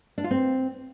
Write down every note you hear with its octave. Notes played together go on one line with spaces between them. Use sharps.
D4
F4
C4